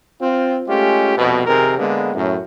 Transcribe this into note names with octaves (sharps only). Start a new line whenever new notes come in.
C4 F4
G#3 A3 C#4 F4 G4
C2 F2 B2
F2 C3 D#3 G#4 A#4
D3 G#3 A#3 B3
F#2 A2